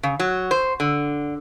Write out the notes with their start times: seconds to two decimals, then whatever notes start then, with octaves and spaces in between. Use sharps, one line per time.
0.03 C#3
0.20 F#3
0.51 C5
0.80 D3